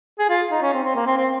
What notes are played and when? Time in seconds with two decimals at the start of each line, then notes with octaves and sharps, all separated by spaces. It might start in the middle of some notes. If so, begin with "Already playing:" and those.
0.19 G#4
0.29 F4
0.51 D#4
0.62 C#4
0.74 C4
0.84 C4
0.96 A#3
1.07 C4
1.17 C4